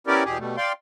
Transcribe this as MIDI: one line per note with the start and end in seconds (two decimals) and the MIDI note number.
0.07 0.24 59
0.07 0.24 61
0.07 0.24 64
0.07 0.24 67
0.07 0.24 70
0.07 0.24 74
0.25 0.38 40
0.25 0.38 47
0.25 0.38 67
0.25 0.38 68
0.39 0.56 47
0.39 0.56 55
0.39 0.56 57
0.57 0.72 74
0.57 0.72 77
0.57 0.72 79
0.57 0.72 84